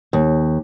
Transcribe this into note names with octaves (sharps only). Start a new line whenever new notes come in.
D#2